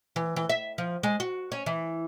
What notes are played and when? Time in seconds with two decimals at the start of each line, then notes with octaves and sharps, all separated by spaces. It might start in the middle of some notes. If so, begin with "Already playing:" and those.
0.16 E3
0.36 E3
0.49 E5
0.78 F3
1.03 G#3
1.20 F#4
1.52 C#4
1.66 E3